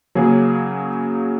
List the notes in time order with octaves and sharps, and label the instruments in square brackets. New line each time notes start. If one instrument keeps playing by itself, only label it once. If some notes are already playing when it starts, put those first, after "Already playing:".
[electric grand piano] C#3 F#3 A#3 C#4 G#4